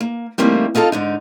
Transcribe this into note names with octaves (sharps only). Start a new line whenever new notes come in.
A#3
E3 G3 A3 A#3 C4 D#4
C4 D#4 F4 A4 F5
G#2 D3 D#4